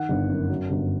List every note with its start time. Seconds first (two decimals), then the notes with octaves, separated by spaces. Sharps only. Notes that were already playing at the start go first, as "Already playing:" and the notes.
Already playing: D#3 F#5
0.09 G1
0.29 F#2
0.49 F#3
0.70 G1